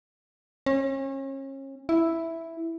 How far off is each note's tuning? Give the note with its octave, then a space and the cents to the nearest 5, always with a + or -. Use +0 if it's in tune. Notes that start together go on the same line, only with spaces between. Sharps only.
C#4 -35
E4 +0